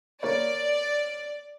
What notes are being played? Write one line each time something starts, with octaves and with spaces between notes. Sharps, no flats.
A#3 C#5 D5